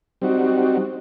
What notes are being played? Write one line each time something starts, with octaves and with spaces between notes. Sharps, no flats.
G3 C4 D#4 F#4